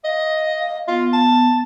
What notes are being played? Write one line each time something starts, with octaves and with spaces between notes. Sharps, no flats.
D#5 F5
F5
B3 F4
A5